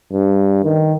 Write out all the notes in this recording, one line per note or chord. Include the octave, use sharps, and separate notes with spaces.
G2
D#3